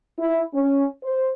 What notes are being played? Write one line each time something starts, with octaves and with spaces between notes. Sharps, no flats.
E4
C#4
C5